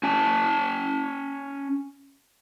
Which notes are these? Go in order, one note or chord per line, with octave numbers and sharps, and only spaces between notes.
C#4 G#5 A5